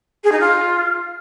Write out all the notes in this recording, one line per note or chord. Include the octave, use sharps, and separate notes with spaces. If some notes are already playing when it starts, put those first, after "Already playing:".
G#4
D#4
F4